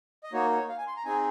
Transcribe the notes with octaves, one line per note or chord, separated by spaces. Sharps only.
D#5
A#3 D#4 F#4 C#5
C#5
F5
G#5
C6
A#5
C4 D#4 G#4 G#5